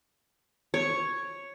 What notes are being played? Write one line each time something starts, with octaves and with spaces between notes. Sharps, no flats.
C#5